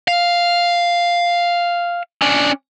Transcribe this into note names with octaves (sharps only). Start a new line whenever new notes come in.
F5
C#4 D4